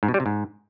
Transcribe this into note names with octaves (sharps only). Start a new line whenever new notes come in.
G#2
B2
G3
C3
G#2